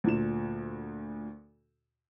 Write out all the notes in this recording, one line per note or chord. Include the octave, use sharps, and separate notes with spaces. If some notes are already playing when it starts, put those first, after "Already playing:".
D2 A#2 E7